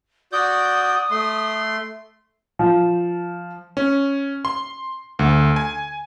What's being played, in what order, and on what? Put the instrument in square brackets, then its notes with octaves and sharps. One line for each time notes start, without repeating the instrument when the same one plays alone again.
[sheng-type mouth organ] F#4 D5 G6 [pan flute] D#6
[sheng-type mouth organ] A3 C6
[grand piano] F3
[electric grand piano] C#4
C6
D2
G#5